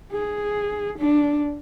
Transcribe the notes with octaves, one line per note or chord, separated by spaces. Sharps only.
G#4
D4